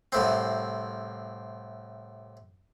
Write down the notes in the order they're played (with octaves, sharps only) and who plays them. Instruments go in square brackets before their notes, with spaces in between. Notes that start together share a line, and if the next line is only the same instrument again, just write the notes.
[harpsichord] C2 A2 C4